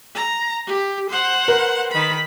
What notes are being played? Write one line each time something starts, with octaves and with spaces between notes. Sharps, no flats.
A#5
G4
C5 F#5
A#4 B4
D#3 B5